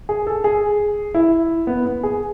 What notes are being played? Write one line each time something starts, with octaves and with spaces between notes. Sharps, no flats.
G#4
A4
G#4
E4
B3
B3
G#4